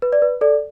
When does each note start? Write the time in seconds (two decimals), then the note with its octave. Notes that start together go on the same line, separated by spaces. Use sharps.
0.02 B4
0.13 D5
0.22 B4
0.41 A4 D5